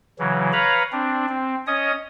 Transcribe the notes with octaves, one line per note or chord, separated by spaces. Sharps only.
C#3 E3 F#3
B4 C#5 F5 A#5 B5
C4 D4
C4
C#4 C#5 D#5 D#6